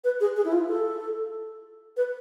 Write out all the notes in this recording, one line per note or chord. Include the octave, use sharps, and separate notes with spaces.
B4
G#4
G#4
E4
F4
A4
B4